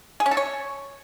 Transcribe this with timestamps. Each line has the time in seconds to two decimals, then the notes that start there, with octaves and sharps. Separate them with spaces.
0.20 G#4
0.26 C#4
0.31 A4
0.37 C#5